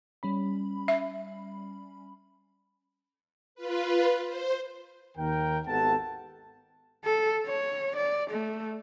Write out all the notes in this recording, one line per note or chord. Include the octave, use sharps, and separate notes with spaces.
G3 C#4 B5
E5
F4 B4
C5
D#2 D#3 A#4 G5
G#1 B3 G4 A4 F#5 A5
A4
C#5
D5
A3